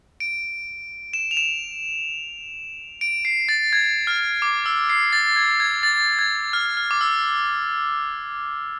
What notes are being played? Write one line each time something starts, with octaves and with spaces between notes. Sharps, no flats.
D7
E7
F7
E7
D7
C7
A6
G#6
F6
D6
E6
C7
A6
G#6
G#6
A6
G#6
F6
F6
D6
E6